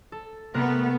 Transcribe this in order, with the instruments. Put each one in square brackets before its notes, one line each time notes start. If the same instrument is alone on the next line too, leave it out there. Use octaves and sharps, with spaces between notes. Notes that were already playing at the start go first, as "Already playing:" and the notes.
[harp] A4
[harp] C3 A#4 F#6 [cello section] A3 B3